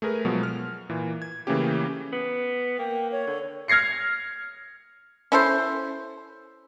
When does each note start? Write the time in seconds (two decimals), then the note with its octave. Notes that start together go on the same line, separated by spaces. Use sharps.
0.02 A3 G#4 A#4 B4
0.25 B2 F3 F#3 G#3 B3
0.43 F6
0.90 A#2 E3
1.22 G#6
1.47 C#3 E3 A3 A#3 C#4 G4
2.13 B3
2.79 A#3 G5
3.12 C#5
3.27 D3
3.68 F6 G#6 A#6 C7 C#7
5.32 C#4 E4 A4 C5